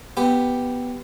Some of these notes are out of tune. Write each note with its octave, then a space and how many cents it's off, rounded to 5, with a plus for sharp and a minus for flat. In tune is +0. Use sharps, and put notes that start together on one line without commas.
B3 +0 G4 +0